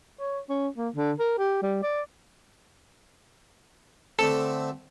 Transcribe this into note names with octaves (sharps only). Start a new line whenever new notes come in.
C#5
C#4
A#3
D3
A#4
G4
G3
D5
D3 A3 C4 A4